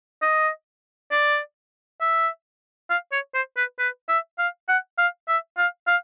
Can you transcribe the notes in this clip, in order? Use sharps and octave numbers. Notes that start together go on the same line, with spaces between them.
D#5
D5
E5
F5
C#5
C5
B4
B4
E5
F5
F#5
F5
E5
F5
F5